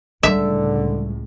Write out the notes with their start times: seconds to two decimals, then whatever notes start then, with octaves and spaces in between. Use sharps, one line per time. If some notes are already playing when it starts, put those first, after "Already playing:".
0.23 C#2 A2 D3 G3 G#3 E5